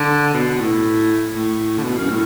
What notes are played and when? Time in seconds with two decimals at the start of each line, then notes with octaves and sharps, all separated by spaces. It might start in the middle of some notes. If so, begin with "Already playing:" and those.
Already playing: D3
0.34 B2
0.59 A2
1.34 A2
1.78 D3
1.84 B2
1.98 F#2
2.10 A2